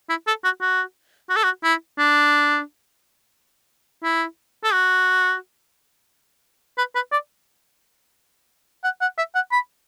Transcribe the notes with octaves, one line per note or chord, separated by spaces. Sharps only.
E4
A4
F#4
F#4
F#4
A4
F#4
E4
D4
E4
A4
F#4
B4
B4
D5
F#5
F#5
E5
F#5
B5